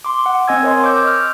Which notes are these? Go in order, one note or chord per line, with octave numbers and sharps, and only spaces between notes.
C6 D6
F#5
C4 D#5 G#5 E6 G#6
A#4 C#5 D#5 C6
C#6 D6 E6 G6
F6